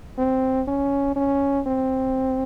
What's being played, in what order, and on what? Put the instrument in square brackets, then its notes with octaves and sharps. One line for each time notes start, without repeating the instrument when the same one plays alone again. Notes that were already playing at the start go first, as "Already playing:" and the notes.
[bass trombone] C4
C#4
C#4
C4